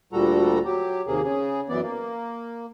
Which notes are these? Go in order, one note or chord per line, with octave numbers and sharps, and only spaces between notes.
D2 A#2 G3 F#4 A4 A#5
F#3 G4
D#2 C3 A#3 G#4
C#3 G#4
F#2 E3 B3 D5
A#3